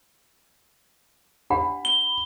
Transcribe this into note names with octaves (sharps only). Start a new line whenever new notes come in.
D4 G4 F#5 B5
G7